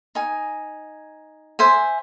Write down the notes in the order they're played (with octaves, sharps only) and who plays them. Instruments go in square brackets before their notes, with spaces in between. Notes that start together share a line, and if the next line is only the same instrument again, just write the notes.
[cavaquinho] D#4 G#5
C5 E5 G#5